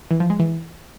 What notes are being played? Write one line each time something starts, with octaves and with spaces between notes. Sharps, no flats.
E3
F3
G#3
E3